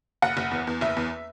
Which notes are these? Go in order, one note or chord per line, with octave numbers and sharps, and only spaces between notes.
F#1 F#5
F#1
E2
E2
F#1 E5
E2